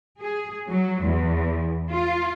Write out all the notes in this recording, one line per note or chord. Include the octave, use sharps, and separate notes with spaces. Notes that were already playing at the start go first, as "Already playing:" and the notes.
G#4
F#3
E2
F4